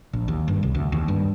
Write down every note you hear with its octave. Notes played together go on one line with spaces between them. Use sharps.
A#1
D#2
G2
C2
D2
D#2
G2